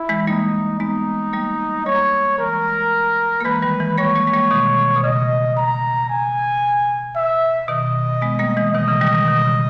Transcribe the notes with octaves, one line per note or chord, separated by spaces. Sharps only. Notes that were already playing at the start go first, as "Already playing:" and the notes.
Already playing: E4
E3 G#3
G3 A#3 D#4
G#3 B3 D#4
G3 A#3
G3 A#3 C#5
E3 G#3 A#4
A#3
E3 G#3 B4
D#3 G3
E3 G#3
G3 A#3 C#5
G3 A#3
G#3
G3 A#3
B2 D#3
B2
C#3 D#5
A#5
G#5
E5
B2 D#3 D#5
G#3 B3
G3 A#3
E3 G#3
B2 D#3 D#5
C#3 E3
D#3 G3
D#3 G3
B2 D#3
C#3